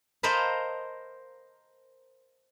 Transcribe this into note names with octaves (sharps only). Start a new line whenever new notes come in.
A#4 C5 D#5 F5 A5 B5